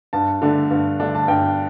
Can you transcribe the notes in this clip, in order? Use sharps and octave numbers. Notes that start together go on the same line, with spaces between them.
G2 A5
D3 A3 D4
G2
D3 A3 D4
A5
G2 G5